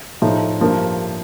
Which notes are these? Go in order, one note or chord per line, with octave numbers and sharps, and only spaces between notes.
A2 F3 A3 D#4
G2 F3 A#3